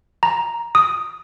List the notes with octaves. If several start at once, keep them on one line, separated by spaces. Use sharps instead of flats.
A#5
D#6